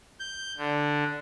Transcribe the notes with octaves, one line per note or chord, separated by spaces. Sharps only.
G6
D3